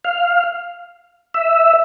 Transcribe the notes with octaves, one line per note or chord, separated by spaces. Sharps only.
F5
E5